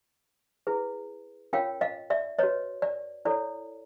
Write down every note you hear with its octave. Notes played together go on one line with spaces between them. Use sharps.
E4 G#4 B4
C#4 F4 A#4 C#5 F5 G5
D#5 F5
D5 E5
F#4 B4 C#5 D#5
D5
E4 A4 C#5 D5